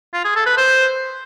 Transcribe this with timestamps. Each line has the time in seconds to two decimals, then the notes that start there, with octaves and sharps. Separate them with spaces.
0.13 F4
0.24 G#4
0.35 A4
0.46 B4
0.57 C5